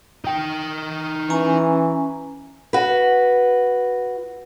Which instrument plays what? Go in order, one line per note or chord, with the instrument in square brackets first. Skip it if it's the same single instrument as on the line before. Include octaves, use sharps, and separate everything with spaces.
[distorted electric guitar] D#4 G5
[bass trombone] E3 [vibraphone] C#4 G#5 A#5
[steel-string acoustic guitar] F#4 B4